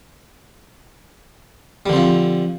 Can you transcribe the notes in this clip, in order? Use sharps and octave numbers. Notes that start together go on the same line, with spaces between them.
D3 F3 G3 C4